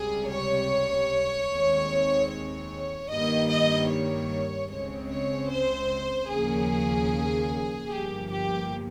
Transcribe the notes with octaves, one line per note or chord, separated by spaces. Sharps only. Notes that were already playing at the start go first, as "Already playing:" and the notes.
Already playing: C#2 C3 G3 G#4
C#5
D#2 D#3 G#3 C4
C#5
G2 D#3 G3 A#3 D#5
D#5
C#5
C#2 C#3 G#3 C4 C#5
C#5
C5
D#2 C#3 F3 A#3 G#4
G1 G2 F3 A#3 G4
G4